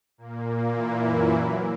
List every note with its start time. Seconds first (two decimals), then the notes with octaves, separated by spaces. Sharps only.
0.18 A#2 A#3
0.75 E3 E4
1.04 F#2 F#3
1.32 A#2